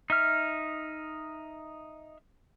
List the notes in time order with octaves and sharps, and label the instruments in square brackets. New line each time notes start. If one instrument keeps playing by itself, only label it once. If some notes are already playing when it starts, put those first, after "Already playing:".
[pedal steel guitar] D#4 E5 F6